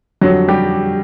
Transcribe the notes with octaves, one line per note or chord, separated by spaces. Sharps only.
F2 D3 F#3 G3 F#4
G3 G4